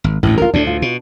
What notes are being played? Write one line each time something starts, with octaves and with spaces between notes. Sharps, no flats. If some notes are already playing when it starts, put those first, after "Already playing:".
G#1
A1 D2 A2
F4 A#4
D2 A2 D4
F4
B2